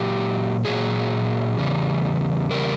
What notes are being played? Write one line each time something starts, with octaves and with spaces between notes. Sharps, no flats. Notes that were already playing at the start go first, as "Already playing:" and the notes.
Already playing: A#2 F#3 G4
A#2 F#3 G#4
E2 C#3 G3
E2 C#3 G3 A#4